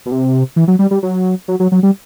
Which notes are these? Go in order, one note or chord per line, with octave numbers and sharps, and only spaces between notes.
B2
C3
E3
F#3
G3
G3
F#3
F#3
F#3
F#3
G3